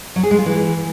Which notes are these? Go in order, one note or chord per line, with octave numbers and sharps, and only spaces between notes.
F#3
G#4
G#3
F4
E3